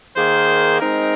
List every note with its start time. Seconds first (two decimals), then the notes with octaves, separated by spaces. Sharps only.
0.16 D#3 A#3 G#4 C5
0.80 G#3 C4 D#4 A#4